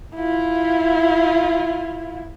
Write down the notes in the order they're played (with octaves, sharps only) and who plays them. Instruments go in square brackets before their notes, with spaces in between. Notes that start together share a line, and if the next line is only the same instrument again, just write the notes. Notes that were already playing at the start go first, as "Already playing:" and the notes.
[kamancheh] E4 F4